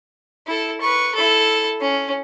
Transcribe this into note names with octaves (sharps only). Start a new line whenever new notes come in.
E4 A4
B4 C#6
E4 A4
C#4